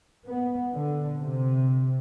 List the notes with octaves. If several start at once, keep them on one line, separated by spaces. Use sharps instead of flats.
B3
D3
C3